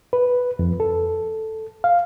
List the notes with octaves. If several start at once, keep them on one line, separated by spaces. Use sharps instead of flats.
B4
F2
A4
F5